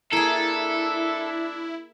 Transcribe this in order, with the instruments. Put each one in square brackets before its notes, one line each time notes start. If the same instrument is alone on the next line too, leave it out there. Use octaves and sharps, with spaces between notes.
[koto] A#3 G#4 [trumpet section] D4 E5 [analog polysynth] E4 [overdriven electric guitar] A4